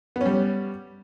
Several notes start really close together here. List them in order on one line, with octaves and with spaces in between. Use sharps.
B3 C#4 G3